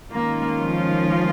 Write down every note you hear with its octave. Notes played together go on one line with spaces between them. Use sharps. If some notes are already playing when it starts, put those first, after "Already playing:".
D#3 G#3 A#3 C#4 F4
F3